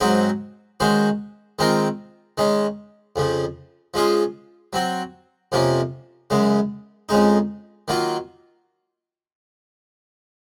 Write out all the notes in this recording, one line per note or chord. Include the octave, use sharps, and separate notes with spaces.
G#2 F#3 C4 D#4 F#4
D#3 G#3 C#4 F#4 C5
D#3 G#3 C4 F4 A#4
D#3 G#3 C#4
F2 C#3 F3
F3 G#3 C#4 F4 G#4
F#3 C4 F#4
F2 C3 F3 A#3 C#4
F#2 C#3 G#3
F2 C#3 G#3 D#4
D#3 F#3 A#3 F4